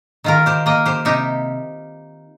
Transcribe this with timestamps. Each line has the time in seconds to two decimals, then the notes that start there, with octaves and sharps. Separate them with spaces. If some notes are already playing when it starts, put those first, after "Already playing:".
0.24 D#3 F4 A#4
0.46 G4 C5
0.66 A#3 A#4 D#5
0.86 G4 C5
1.05 C3 D#4 G4